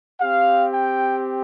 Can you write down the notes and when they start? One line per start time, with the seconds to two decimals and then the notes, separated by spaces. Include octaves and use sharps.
0.21 C4 G4 F5
0.74 G5